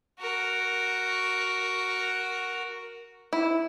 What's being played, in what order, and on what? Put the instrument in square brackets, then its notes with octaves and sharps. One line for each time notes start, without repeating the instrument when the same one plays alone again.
[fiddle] F#4 A#4
[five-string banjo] E4